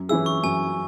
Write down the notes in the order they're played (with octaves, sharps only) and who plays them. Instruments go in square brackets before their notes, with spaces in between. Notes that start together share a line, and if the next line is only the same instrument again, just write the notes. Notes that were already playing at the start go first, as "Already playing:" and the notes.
Already playing: [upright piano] F#2
[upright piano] E3 C#4 E4 G#4 [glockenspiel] E6
[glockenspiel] C#6
[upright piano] F#2 [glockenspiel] G#5